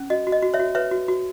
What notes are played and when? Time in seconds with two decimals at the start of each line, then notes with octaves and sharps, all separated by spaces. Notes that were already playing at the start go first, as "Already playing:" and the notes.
Already playing: C#4
0.10 F#4 D#5
0.27 F#4
0.32 D#5
0.42 F#4
0.54 C#5 E5
0.59 F#4
0.75 B4 C#5 E5
0.91 F#4
1.08 F#4